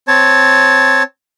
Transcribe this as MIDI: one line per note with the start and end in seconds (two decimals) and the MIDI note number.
0.08 1.03 60
0.08 1.03 73
0.08 1.03 81